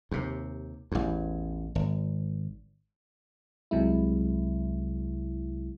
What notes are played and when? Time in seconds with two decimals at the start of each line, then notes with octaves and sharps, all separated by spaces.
0.11 D#2 C3
0.92 A1 E2
1.75 G#1
3.71 C2 C3 F#3 G#3 E4